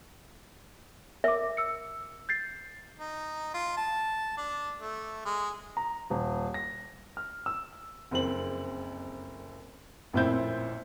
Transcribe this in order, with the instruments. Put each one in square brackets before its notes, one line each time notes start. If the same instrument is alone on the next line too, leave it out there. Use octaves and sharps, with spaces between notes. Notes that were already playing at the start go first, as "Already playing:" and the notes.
[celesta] A#4 D6 [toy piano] E5
[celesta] E6 C#7
G6 A6 C7
[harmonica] D#4
F4
A5
D4
A3
G#3
[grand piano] A#5
D#1
A#6
F6
E6
[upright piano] F#1 F2 C4 F#7
A1 F2 A#2 C4 E4 G6